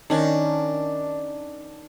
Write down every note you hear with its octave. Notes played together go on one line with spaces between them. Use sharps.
D#3 C#4 D4